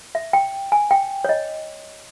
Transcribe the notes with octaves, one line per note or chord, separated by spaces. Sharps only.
E5
G5
G#5
G5
C#5
D#5